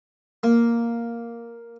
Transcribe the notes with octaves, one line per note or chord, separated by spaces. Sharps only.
A#3